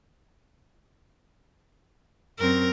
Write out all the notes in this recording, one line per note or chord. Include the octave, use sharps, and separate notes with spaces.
F#2 C4 A#4